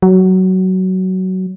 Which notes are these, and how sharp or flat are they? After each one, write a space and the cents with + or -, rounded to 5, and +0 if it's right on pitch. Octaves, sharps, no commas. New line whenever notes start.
F#3 +15